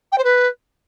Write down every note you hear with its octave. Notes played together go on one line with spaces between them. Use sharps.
G5
C5
B4